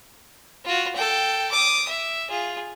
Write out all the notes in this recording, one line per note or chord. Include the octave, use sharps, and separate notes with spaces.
F4 F#4
A4 G5
D6 D#6
E5
F4 G#4